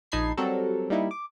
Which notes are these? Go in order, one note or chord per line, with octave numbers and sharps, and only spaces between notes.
A#1 D#4 A5 B5 G#6 C7
F#3 G3 C4 F#4 A4 A#4
G3 A#3 D#4 E4
D6